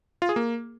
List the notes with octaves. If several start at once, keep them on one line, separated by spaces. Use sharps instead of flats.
F4
G#4
A#3